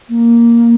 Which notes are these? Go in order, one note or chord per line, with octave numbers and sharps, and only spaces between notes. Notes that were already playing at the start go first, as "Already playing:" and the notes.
A#3